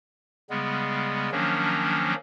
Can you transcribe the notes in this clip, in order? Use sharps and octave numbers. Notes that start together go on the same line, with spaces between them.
C#3 G3 G#3 B3
D#3 F3 F#3 A#3 C#4 D4